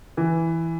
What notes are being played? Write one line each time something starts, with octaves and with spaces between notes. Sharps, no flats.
E3